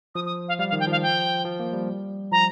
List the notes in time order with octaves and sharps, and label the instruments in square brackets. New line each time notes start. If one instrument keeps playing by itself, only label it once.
[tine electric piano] F3 [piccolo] D#6
[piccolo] D#6
F5
[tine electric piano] G3 [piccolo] F5
[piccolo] F5
[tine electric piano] D#3
[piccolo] G5
[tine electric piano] F3 [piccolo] F5
[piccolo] G5
[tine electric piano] F3
A#3
G3
[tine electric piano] F3 [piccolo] A#5